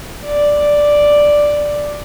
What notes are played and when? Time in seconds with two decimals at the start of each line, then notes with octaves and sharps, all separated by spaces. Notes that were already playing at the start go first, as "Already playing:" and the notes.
0.25 D5